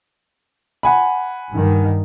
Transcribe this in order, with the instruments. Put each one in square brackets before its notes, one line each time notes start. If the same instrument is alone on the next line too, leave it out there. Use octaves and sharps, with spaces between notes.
[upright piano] F#5 G#5 B5
[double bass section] G2 D#3